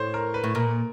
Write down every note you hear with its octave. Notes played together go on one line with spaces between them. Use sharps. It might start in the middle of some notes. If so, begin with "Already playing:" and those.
Already playing: A2 C5 C#5
A#4
B4
A2
A#2 A#4